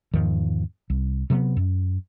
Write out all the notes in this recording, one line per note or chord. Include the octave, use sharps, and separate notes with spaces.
E2 G#2 D#3 F3
C2
C3 F#3 A3 B3
F#2